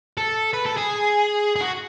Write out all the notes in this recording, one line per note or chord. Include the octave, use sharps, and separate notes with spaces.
A4
B4
A4
G#4
G#4
F#4